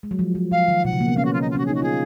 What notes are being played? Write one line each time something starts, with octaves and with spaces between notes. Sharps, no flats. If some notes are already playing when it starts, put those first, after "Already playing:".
G#3
F#3
F3
F3
F3 F5
D#3
B2 F#5
C#3
A#3
B3
C#4 F5
F#4
F4
D#4
F4
C#4 F#4
D#4 G#4
F#4
F4 G#4